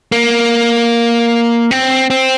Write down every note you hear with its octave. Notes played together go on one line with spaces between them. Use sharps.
A#3
C4
C4